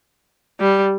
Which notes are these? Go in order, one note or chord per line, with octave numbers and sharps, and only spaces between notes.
G3